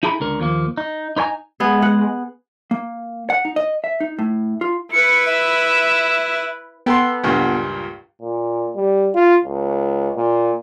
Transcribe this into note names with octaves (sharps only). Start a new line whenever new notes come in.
D#4 E4 G#4 A4 A#5 B5
C#2 D3 A#4
D#2 F3 A#3
D#4
D#4 B4 C#5 G#5 A#5
G#3 B3 G#4
F#5
A#3
F#5
D#4
D#5
E5
D#4
A2
F4
E4 B4 C#7
E5
B3 A4 G5 C6
C#2 G2 A#2
A#2
G3
F4
C#2
A#2